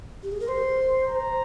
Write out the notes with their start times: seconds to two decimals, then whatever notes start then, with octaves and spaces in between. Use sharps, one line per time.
0.23 G4
0.32 G#4
0.40 A#4
0.48 C5 C6
1.06 A#5